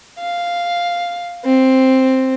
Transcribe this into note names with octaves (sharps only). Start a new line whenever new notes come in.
F5
C4